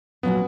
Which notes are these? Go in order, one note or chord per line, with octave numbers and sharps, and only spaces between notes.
A#2 F#3 B3 C#4 F#4